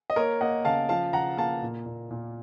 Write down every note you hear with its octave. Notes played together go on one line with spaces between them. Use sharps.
D#5
A#3 A#4 C#5
A#3 D#5 F#5
C#3 F5 A5
F3 F5 A5
C#3 F#5 A#5
A#3 F5 A5
A#2
A#2
A#2